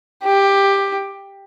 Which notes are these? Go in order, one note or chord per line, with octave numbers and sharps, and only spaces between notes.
G4